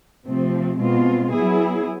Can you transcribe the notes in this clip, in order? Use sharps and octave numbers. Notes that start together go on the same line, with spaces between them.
C3 F3 A3 C4
B2 G#3 C4 F4
F#3 B3 E4 G#4